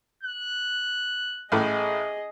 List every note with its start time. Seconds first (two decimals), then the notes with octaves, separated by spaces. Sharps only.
0.23 F#6
1.52 A1 A2 G#4 D#5